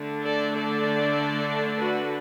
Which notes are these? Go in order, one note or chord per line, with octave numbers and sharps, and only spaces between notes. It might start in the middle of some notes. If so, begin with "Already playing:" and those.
Already playing: D3 A3 D4
A4 D5
A4 D5
F#4 B4